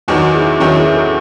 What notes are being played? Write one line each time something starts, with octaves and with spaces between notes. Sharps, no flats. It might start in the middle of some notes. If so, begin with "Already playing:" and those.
E2 D#3 F#3 D#4 F#4
E4 G#4
E2 D#3 F#3 C#4 E4
E4 G#4
F#4 A4